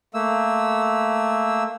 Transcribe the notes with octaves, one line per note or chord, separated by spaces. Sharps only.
A3 A#3 E6